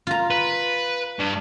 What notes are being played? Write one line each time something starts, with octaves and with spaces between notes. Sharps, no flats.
F4 A#5
B4
G2